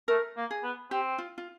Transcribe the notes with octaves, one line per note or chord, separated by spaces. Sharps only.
A3 A#4
A#3
G#4
B3
C4 G4
F4
F4